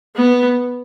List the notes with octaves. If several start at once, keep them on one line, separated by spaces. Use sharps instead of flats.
B3